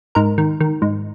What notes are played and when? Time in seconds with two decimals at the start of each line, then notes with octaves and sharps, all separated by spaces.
0.15 G#2 A#4
0.38 D#3
0.60 D#3
0.82 G#2